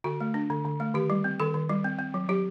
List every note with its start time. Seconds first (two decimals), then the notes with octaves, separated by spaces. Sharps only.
0.04 D3 F#4
0.20 A3
0.34 D4
0.50 D3
0.65 D3
0.80 A3
0.94 D#3 G4
1.10 G3
1.24 C4
1.40 D#3 A4
1.54 D#3
1.69 G3
1.84 C4
1.99 C4
2.14 F#3
2.29 F#3 G4